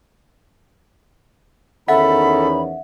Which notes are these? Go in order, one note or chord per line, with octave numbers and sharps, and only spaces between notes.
E2 D#3 C#4 A4 E5 F#5 B5